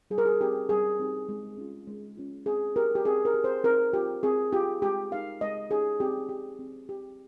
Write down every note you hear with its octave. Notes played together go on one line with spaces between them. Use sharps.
G3 G#4
A#4
G#4
C4 D#4 G4
G3 G#4
C4 D#4 G4
G#3
C#4 F4
G#3
C#4 F4
C4 G#4
G4 A#4
G4
C4 G#4
A#4
G4
C5
C4 A#4
F4 G4
C4 G#4
F4 G4
G#3 G4
D#4 G4 F5
G#3 D#5
D#4 G4 G#4
C4 G4
G4
C4
G4